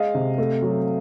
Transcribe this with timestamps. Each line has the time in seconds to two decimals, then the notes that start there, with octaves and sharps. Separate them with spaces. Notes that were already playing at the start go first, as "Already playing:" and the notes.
Already playing: G#3 D#5 F5
0.14 C3
0.38 A3
0.62 F#3